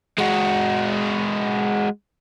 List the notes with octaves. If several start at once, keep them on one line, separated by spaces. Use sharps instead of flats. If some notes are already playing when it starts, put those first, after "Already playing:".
G#3 F#4